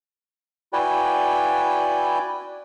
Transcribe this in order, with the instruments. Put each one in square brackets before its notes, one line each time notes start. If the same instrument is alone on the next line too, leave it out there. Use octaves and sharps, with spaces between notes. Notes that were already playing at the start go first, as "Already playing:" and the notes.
[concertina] E4 F#4 B4 D5 G5 G#5